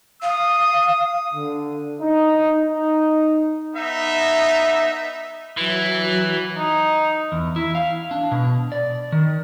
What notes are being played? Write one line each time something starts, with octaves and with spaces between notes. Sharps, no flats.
F5 D#6
D3
D#4
D#4
B3 D#4 E5
E3 F#3
D#4
E2
E4
F5
D4
B2
D5
D#3